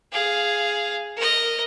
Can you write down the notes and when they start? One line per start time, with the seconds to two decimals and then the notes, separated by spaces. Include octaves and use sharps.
0.12 G#4 F5
1.17 A#4 D#5